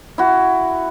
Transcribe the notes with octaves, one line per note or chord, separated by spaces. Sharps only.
E4 F#4